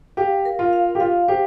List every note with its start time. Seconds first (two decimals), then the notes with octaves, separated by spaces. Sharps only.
0.17 G4 F5
0.45 A#4
0.59 F4
0.73 F5
0.95 G4
1.00 F4 F5
1.28 G4 C5